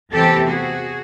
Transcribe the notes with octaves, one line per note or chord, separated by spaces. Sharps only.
E2 C3 E3 A3 C4 G4 A4
F#4 G#4